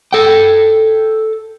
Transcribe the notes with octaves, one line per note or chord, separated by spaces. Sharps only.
A4 G5